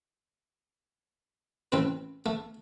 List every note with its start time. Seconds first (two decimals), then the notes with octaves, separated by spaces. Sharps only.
1.72 A1 C4 B4
2.26 A3